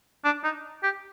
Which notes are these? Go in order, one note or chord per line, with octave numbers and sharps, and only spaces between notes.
D4
D#4
G4